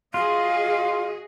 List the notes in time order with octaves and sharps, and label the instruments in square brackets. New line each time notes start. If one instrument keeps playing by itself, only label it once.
[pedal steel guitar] F4 [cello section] F#4 G#4 D#5 [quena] F5